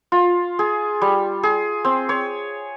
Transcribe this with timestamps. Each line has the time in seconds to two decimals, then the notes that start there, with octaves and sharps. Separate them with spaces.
0.12 F4
0.59 G#4
1.02 G3
1.43 G#4
1.85 C4
2.09 C#5